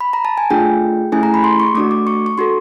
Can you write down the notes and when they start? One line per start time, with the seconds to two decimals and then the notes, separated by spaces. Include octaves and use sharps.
0.00 B5
0.13 A#5
0.25 A5
0.38 G#5
0.50 A3 D4 F4 G#4 G5
1.12 A3 C#4 E4 G#4 G#5
1.23 A#5
1.34 B5
1.44 C6
1.60 C#6
1.75 A3 D4 F#4 D6
1.91 D6
2.07 C#6
2.26 C#6
2.37 D4 F#4 A4 C6